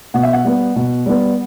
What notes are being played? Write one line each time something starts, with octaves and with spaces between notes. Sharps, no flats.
B2 F#5
E5
F#5
G3 B3
B2
G3 B3